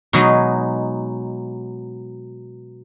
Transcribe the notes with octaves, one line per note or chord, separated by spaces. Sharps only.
B2 F#3 G#3 D#4